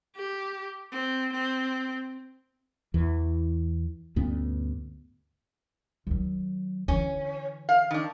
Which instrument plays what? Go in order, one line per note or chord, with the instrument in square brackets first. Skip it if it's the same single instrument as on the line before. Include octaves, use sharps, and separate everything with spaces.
[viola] G4
C4
C4
[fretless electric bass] E2 E3
D2 G2 B3 C#4
[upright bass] D#3 F#3
[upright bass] D3 E3 [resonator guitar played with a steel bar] C#4
[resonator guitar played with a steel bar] F5
D#3 D4